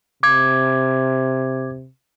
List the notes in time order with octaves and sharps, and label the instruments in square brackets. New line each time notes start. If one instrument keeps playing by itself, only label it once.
[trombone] C3 [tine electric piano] D6 G#6